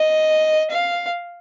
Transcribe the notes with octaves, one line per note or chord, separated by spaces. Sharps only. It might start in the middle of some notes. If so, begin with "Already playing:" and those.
Already playing: D#5
F5